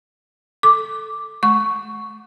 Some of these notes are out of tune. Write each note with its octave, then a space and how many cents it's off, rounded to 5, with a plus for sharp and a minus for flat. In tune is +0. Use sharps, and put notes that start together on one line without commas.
A4 +0 D6 +0
A3 -40 C#6 +0